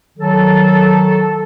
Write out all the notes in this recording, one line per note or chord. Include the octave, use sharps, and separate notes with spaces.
D#3 F#3 A4